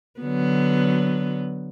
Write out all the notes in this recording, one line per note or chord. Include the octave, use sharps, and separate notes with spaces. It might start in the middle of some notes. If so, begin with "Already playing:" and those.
D3 F#3 B3